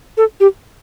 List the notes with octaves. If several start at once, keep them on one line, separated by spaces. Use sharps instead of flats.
A4
G4